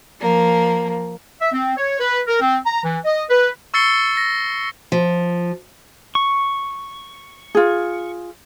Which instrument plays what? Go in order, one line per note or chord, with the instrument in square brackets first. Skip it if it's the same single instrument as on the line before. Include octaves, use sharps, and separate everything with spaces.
[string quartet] F3 A#3
[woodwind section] E5
C4
C#5
B4
A#4
C4
A#5
E3
D#5
B4
[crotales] C#6 E6 A6 C7 C#7 G7
A#6
[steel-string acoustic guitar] F3
[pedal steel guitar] C#6
[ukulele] F4 G#4